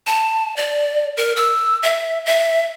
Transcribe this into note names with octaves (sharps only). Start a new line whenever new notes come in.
A5
D5
A#4
E6
E5
E5